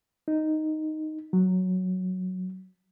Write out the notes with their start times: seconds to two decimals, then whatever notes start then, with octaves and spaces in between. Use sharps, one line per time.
0.28 D#4
1.33 F#3